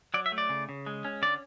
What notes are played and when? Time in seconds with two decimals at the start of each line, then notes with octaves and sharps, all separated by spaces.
0.14 F#3 D5
0.26 E5
0.32 A3
0.38 D5
0.49 C#3
0.69 C#3
0.86 G#3
1.05 C#4
1.22 D3 D5